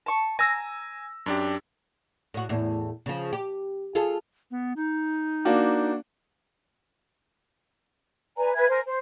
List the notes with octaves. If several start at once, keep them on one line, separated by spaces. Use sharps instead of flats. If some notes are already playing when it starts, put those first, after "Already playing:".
A5 C#6
G#5 A#5 E6 A#6
F#2 D4 G4
A2 F#4
E2 A2
C#3 F3
G4
F4 G#4 A4
B3
D#4
A#3 D4 F#4
B4 D5 G#5 A#5
B4 E5 G#5 G#6
A#4 C5 G#5
C5